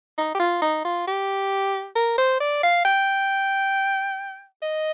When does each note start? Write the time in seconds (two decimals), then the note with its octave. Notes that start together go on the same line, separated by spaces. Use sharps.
0.18 D#4
0.35 G4
0.40 F4
0.62 D#4
0.85 F4
1.07 G4
1.96 A#4
2.18 C5
2.40 D5
2.63 F5
2.85 G5
4.62 D#5